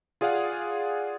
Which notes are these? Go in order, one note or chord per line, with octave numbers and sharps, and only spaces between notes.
F4 G#4 D5 F5 F#5